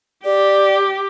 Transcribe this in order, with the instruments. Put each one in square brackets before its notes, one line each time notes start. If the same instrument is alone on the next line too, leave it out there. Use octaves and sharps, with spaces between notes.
[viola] G4 [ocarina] D5